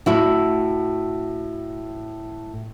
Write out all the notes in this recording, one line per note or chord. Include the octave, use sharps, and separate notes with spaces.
A2 E4 F#4